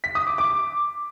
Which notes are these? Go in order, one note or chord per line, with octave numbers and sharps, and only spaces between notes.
B6
D#6
D6
D6